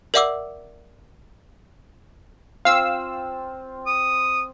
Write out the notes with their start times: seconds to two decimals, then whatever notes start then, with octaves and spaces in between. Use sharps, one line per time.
0.14 A#4 D5 E5 F#5 D6 E6
2.65 C4 F4 F5 E6
3.86 D#6